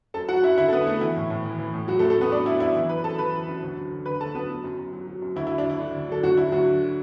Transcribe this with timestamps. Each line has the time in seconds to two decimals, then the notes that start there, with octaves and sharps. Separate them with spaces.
0.14 F#2 A4 A5
0.28 F#3 F#4 F#5
0.43 F#2 E4 E5
0.57 D3 E4 E5
0.68 A4
0.72 F#2 B3 B4
0.86 F#3 A3 A4
1.01 E3 E4
1.16 A2
1.30 A2
1.45 E3
1.59 E3
1.74 A2
1.88 F#3 F#4
1.99 A3 A4
2.03 F#2
2.10 A3 A4
2.18 F#2 B3 B4
2.32 F#3 D4 D5
2.46 F#3 E4 E5
2.60 F#2 E4 E5
2.75 E3
2.89 F#2 B4 B5
3.04 F#2 A4 A5
3.18 E3 B4 B5
3.33 E3
3.48 F#2
3.63 D2
3.77 F#3
3.91 D2
4.06 D3 B4 B5
4.20 D2 A4 A5
4.35 F#3 B3 B4
4.50 F#3
4.64 F#2
4.79 F#2
4.93 F#3
5.07 F#3
5.22 F#2
5.36 D2 E4
5.47 E4
5.51 F#3
5.58 D4
5.65 D2 E4
5.80 D3
5.95 D2
6.09 F#3 A4
6.23 D2 F#3 F#4
6.37 F#3 E4
6.52 D2 F#3 F#4
6.67 D3